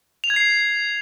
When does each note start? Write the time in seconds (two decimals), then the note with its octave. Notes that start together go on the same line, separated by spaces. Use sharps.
0.24 F7
0.30 G#6
0.36 C7